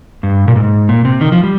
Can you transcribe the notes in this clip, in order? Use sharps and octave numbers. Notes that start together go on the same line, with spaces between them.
G2
A#2
G#2
A#2
C3
D#3
F3
G3